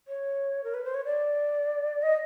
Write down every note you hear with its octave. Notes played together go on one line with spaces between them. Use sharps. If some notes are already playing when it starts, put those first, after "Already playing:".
C#5
A#4
B4
C5
C#5
D5
D#5